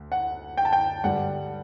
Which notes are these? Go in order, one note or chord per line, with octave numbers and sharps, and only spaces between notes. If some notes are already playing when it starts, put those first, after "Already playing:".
Already playing: D2
F#5
G5
A5
G5
G2 D3 G3 F#5